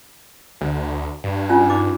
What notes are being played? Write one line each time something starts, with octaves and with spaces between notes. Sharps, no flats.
D2
G2
C#4 F4 G#5
D#4 D6